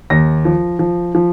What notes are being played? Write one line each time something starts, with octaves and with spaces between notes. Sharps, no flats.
D#2 A#6
F3
F3
F3